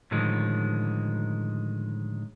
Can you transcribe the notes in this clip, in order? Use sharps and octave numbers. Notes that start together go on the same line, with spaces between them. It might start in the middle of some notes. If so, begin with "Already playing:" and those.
A2 D3 D#3 F3 G#3